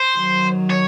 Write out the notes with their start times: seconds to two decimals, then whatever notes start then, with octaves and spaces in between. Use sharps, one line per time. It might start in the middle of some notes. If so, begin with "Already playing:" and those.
Already playing: C5
0.18 D#3 F#3
0.71 C#5